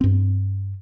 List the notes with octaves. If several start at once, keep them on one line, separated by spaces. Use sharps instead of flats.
G2 C4